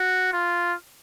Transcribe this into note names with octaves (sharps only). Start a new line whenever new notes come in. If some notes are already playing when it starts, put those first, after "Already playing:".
Already playing: F#4
F4